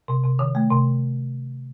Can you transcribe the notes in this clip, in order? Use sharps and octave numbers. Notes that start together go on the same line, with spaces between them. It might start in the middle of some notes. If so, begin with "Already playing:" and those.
C3
C3
D#3
A3
C3